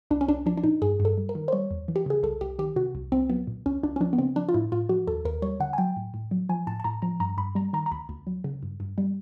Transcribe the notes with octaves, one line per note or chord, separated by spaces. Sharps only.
C2 D4
C#4
C2 D4
F3 D4
D4
A#2 D#4
G2 G#4
G2
A4
G3
A#4
D#3
C5
G3 C#5
E2
E3
G4
C#3 G#4
C2 A4
C2 G4
D#3 G4
C3 F#4
C2
C2 C4
F#3 B3
A#2
C#2 C#4
C#2 D4
C#4
F3 D4
B3
C#3 C4
F3 D4
F4
A2 E4
A2 F4
F3 F#4
D#2 A4
D#2 A#4
G3 C#5
D3 F#5
G#5
F#3 G5
A2
A2
F#3
F3 G#5
A2 A5
A5
A2 A#5
F3 A#5
G2 A#5
G2 B5
G3 A#5
D#3 A#5
A#5
D2 B5
D2
F#3
C#3
G2
G2
G3